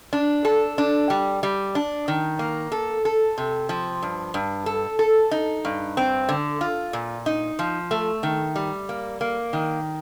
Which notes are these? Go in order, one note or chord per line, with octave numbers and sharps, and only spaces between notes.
D4
A4
D4
G3
G3
D4
D#3
A#3
A4
A4
C3
F3
G2
G2
A4
A4
D#4
G2
C4
D3
F4
A#2
D#4
F3
A3
D#3
G3
A#3
A#3
D#3